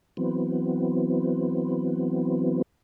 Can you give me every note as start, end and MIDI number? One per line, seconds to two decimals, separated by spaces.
0.17 2.62 52
0.17 2.62 54
0.17 2.62 59
0.17 2.62 60